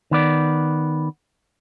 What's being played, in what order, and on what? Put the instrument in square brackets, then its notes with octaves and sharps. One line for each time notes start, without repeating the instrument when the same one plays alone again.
[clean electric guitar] D#3 B3 D5